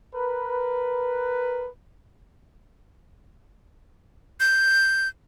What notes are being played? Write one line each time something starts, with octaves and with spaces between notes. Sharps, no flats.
A#4 B4
G6